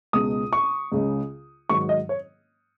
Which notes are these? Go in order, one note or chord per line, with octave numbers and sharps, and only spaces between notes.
C#2 B2 G#3 D#6
C#6
C#2 C#3 G#3
G#2 D#3 F#3 C#6
D#5
C#5